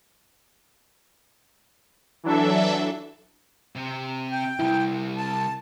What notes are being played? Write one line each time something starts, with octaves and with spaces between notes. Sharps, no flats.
E3 F#3 D4 A4 E5
C3 C4
G5
C2 F2 E4
A5